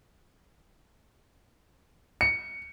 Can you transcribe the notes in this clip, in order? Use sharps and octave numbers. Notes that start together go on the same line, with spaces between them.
C#7